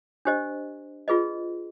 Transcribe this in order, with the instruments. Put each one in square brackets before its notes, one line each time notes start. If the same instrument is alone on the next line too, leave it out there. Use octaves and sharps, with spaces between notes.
[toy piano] D4 G4 C5 D#5
F4 G#4 B4 D#5